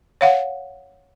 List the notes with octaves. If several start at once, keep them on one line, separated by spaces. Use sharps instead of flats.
C#5 F5 F#5